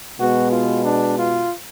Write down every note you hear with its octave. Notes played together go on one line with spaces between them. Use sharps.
B2 G#3 B3 F#4
F4
D4
F4